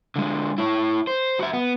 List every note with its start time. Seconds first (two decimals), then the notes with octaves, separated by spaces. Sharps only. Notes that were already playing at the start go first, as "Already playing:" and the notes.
0.16 D3 G#3
0.58 E4 C#5
1.07 C5
1.39 F#4 E5
1.53 B3